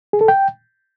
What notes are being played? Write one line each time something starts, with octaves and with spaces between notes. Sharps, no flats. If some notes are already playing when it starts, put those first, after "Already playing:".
G#4
A4
G5